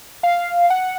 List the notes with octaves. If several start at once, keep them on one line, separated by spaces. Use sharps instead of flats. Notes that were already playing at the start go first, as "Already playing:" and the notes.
F5
F#5